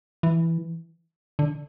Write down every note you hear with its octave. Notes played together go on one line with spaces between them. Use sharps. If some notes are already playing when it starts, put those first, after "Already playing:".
E3
D3